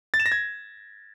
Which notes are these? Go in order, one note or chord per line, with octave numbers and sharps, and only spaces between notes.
A6
E7
A#6
G#6